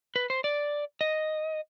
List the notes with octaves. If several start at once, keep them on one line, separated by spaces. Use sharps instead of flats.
B4
C5
D5
D#5